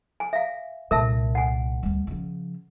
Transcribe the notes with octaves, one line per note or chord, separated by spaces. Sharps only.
G#5
E5 F5
C2 A#2 A#4 E5 A5
F#5 G#5
D2 G3
C#3 F3